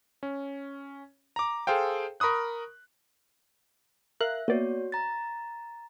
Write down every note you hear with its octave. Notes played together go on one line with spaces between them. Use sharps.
C#4
A#5 D6
G#4 A4 C5 F5 G5
A#4 B5 C#6 D#6 F#6
A#4 E5 F5 F#6
A#3 B3 F#4 C#5 D5
A#5 A6